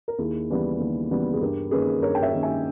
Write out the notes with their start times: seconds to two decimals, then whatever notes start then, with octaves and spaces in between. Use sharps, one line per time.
0.08 A#4
0.18 D#2 E4 G#4
0.50 C#3 E3 G3 B3
0.80 D#2
1.10 C#3 E3 G3 B3
1.34 G#4
1.41 G2 G4 A#4
1.71 D#3 A#3 C#4 G#4 B4
2.02 G2 A#4 C#5
2.15 G5
2.23 C#5 E5
2.33 D#3 A#3 C#4
2.43 E5 G#5